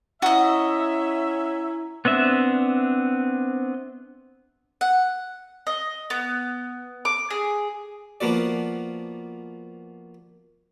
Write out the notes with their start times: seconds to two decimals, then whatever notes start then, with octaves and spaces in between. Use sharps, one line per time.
0.22 C#4 E4 F#4 D#5 E5 A#5
2.05 B3 C4 D4 E5
4.81 F#5
5.67 D#5
6.10 B3
7.05 D6
7.30 G#4
8.21 F3 A#3 B3 F#4 D5